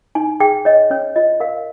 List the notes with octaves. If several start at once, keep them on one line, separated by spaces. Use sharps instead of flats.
D#4 G#5
G#4 G5
C#5 D#5
C#4 C#5
F4 D#5
A#4 F5